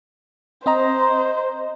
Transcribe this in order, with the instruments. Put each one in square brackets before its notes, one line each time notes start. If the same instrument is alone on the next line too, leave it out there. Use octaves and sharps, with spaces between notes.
[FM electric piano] C4 D#5 A#5 [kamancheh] C5